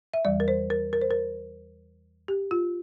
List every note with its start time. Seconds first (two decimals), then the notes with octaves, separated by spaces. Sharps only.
0.14 E5
0.25 E2 E3 G3 D5
0.40 A#4
0.48 C5
0.70 A#4
0.93 A#4
1.02 C5
1.11 A#4
2.28 G4
2.51 F4